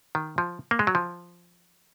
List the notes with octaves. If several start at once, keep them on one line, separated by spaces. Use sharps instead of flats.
D#3
F3
A#3
G#3
F#3
F3